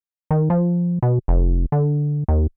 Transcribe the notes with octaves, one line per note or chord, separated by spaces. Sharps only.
D#3
F3
B2
F1
D3
D#2